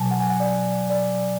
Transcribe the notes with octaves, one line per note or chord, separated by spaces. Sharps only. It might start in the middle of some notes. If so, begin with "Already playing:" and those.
Already playing: B2 F#3 G#5 A5
F#5
G#5
F#5
D5
D5